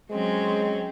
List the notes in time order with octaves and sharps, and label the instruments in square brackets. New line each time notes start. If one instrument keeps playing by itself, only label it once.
[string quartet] F#3 C4 C#4 [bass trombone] G#3